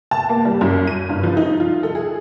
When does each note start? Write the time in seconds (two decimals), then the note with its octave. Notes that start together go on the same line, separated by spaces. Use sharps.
0.11 A5
0.29 A#3
0.45 G3
0.61 F#2
0.87 D#7
1.09 G2
1.23 F3
1.37 D#4
1.60 F4
1.83 A4
1.95 G#4